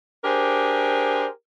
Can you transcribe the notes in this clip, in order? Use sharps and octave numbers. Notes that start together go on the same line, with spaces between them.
D4 G4 G#4 A#4 C5